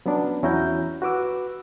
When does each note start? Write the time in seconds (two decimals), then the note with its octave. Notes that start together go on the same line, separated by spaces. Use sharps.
0.06 F#3 B3 C#4 D4
0.43 E2 C#4 E4 F#4 A#5 G6
1.02 F#4 B4 D6 E6